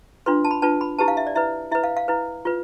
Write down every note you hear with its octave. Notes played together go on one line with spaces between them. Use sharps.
D4 F4 B4 C6
A5
B5
D4 F4 B4 A5
B5
E4 G4 B4 A5
F5
E5
D5
E4 B4 E5
E4 B4 E5
F5
F5
E4 B4
F4 B4